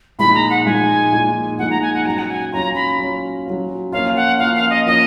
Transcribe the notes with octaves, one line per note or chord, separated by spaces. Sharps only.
A#2 F3 G#3 D#4 B5
A#5
F#5
A#2 F3 G#3 D#4 G#5
A#2 F3 G#3 D#4
A#2 F3 G#3 D#4 F#5
A#5
G#5
F#5
F#3 C#4 F4 A#5
F#5
G#5
F#3 C#4 F4 A#5
B5
F#3 C#4 F4
F#3 C#4 F4
F3 A#3 C#4 F4 F5
F#5
F3 A#3 C#4 F4 F5
F5
D#5
F3 A#3 C#4 F4 D#5